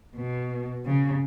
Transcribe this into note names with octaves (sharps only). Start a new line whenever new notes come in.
B2
C#3